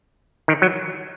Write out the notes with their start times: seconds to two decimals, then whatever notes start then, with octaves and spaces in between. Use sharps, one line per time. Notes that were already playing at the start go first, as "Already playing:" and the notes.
0.48 D#3
0.62 F#3